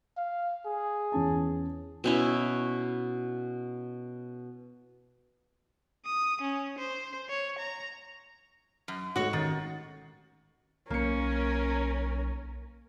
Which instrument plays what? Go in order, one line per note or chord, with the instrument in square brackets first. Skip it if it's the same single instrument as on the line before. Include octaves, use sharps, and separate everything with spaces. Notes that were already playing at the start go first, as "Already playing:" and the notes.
[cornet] F5
G#4
[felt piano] E2 C#4 A5
[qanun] B2 C#4 E4
[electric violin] D#6
C#4
C5
C#5
A#5
[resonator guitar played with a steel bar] F#2
[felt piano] G#2 A3 [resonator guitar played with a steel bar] F#4 C#5
[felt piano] A1 A6 [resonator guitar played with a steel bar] D#3
[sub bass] B1 [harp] A#3 C#7 [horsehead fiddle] C#4 A#4